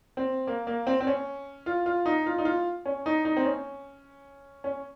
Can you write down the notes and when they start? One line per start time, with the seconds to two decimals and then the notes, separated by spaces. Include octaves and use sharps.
0.17 C4
0.47 A#3
0.67 A#3
0.87 C4
1.00 C4
1.07 C#4
1.66 F4
1.86 F4
2.06 D#4
2.26 F4
2.38 D#4
2.45 F4
2.85 C#4
3.06 D#4
3.25 D#4
3.37 C4
3.45 C#4
4.64 C#4